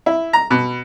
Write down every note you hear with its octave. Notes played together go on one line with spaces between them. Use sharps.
E4
A#5
B2